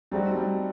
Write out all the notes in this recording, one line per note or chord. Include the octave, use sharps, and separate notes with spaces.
F#3 G3 A3 C4 D#4 F#4
G3